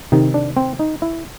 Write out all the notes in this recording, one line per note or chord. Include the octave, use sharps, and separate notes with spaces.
C3 D#3 D#4
D4
C4
D#4
E4